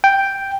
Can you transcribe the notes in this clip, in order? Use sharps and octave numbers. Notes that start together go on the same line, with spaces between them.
G5